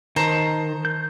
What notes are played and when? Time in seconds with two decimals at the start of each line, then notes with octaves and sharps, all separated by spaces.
0.16 D#3 C5 A5 A#5
0.85 G6